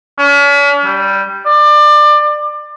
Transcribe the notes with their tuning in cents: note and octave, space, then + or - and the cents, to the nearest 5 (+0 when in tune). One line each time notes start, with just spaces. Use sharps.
C#4 +45
G3 -5
D5 +25